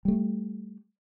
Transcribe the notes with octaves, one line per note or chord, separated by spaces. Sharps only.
G3 A3